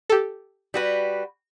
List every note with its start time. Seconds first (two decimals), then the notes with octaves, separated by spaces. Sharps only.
0.10 G4 A4
0.74 G3 F#4 B4